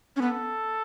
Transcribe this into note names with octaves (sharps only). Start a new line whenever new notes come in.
C#4
B3 A4